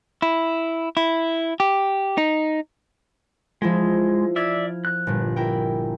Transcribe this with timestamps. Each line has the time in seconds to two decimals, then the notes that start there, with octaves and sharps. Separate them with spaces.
0.22 E4
0.97 E4
1.60 G4
2.18 D#4
3.62 F3 G#3 E4 F4
4.36 D5 E5 F6 G#6
4.85 F#6
5.07 G1 A#2
5.36 E4 A#4 G5